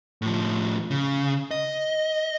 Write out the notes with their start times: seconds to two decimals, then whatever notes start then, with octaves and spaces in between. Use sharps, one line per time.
0.22 A2 F3
0.91 C#3
1.51 D#5